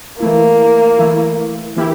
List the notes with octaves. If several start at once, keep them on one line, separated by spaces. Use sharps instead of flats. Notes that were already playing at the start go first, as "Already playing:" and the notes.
E3 A3 A#3 E4
E3 A3 E4
E3 A#3 E4 G4